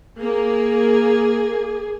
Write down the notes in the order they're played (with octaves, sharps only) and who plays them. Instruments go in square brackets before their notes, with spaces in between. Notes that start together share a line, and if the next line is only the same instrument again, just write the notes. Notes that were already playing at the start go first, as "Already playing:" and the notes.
[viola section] A#3 [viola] G#4